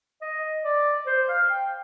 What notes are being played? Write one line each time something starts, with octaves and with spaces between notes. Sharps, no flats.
D#5
D5
C5
F5
G5